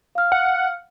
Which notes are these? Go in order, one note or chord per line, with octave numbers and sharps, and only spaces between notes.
F5 F6
F#5